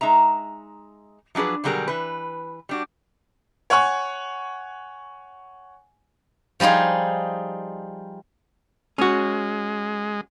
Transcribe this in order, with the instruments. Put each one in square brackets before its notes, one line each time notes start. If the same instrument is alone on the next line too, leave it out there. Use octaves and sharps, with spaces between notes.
[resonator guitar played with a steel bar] G#3 D#4 E5 A#5
F3 F#3 D4 G#4 B4
B2 D3 F#3 G3 G#4 A#4
E3 B4
G3 D4 F#4
[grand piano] C#5 F#5 G#5 C#6
[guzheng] F3 G3 D#4 F4 G#4
[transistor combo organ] G#3 [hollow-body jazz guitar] C#4 F#4